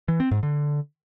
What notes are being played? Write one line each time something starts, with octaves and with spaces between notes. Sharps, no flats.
E3
C4
G#2
D3